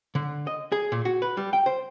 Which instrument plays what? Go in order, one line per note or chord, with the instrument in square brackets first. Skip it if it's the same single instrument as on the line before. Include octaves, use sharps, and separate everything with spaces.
[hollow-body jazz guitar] D3
D#5
G#4
A#2
F#4
B4
G3
G5
C5